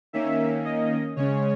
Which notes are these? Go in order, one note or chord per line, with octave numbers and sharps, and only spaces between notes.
D#3 A#3 C#4 E5
D#5
C#3 G#3 C#4 C#5